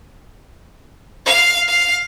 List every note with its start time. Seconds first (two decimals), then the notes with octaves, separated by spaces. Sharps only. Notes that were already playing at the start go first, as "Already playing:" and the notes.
1.25 F5
1.68 F5